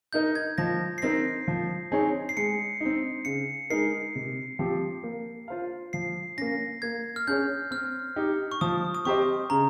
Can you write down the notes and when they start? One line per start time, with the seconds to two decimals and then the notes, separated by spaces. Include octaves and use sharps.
0.13 D#4 A#4 D#5 G6
0.35 G#6
0.58 F3 A#6
0.98 C7
1.02 C4 D#4 A#4 A#6
1.48 F3
1.92 C4 D#4 G#4 C#5
2.29 C7
2.37 G#3 C#7
2.80 C4 D#4
3.25 C#3 C#7
3.70 G#3 D#4 A#4 C7
4.15 C3
4.59 F3 C4 G4
5.03 A#3
5.48 F4 C5 F5
5.93 F3 C7
6.37 A#3 C#4 A#6
6.82 A#3 G#6
7.16 F6
7.27 C#4 G#4 C#5 G6
7.71 C4 F6
8.16 D#4 G4
8.52 C#6
8.61 F3 D#6
8.95 D#6
9.05 C4 G4 C5 D#5 C#6
9.50 C#3 A#5